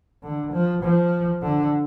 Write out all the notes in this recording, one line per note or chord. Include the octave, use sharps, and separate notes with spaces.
D3
F3
F3
D3